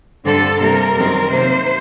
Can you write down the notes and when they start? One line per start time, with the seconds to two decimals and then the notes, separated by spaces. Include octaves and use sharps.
0.24 G2 D3 G3 C4 A4
0.60 C3 G3 A#3 A#4
0.95 F#2 D#3 G3 C4
1.31 C3 F#3 A#3 C5